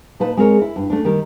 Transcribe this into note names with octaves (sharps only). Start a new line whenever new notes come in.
A#2 D#4 B4 A5
G#3 C4 G#4 A#4 C#5
E4
G2
A3 C#4 D4
D#3 G3 G4 A#4